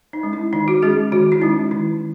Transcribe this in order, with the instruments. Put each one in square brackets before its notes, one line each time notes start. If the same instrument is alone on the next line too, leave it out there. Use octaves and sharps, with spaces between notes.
[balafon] D#4
G#3 C#4
E4
D#3 D#4
F#4
G#3 C#4 G#4
D#3 F#4
E4
G#3 C#4 D#4
D#3 E4